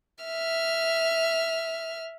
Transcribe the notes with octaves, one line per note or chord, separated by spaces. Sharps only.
E5 F6